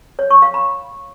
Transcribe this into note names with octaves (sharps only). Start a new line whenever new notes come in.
C#5
C#6
F5
B5